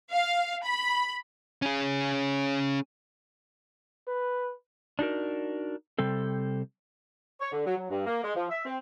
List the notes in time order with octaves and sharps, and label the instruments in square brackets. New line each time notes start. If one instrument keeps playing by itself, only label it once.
[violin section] F5
B5
[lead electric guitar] C#4 G#4
[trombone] B4
[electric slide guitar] D4 D#4 F#4 A#4
C3 G3 C4 A4
[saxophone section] C#5
D3
F#3
F#3
G2
A#3
G#3
F3
E5
C4